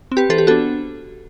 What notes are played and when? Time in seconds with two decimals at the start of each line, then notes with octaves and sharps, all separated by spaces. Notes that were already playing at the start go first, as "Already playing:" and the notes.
0.12 C4
0.17 G4 B4
0.29 E3 A4 C5
0.38 G4
0.47 B3 F#4 A4
0.51 D4